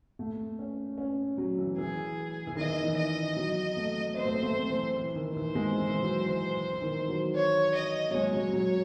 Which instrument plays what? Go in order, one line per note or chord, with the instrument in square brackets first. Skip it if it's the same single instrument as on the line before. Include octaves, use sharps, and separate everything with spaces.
[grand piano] A3
C#4
C#4
F#3
E3
[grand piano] E3 [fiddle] G#4
[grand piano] E3
[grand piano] D#3 [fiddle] D#5
[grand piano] E3
[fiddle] D#5
[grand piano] F#3
A3
[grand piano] C4 [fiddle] C5
[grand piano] A3
C4
A3
E3
E3
D#3
[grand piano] E3 [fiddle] C5
[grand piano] G#3
E3
E3
F#3
E3
E3
D#3
F#3
[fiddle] C#5
D#5
[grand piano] F#3
[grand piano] G#3 [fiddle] C#5
[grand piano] F#3
F#3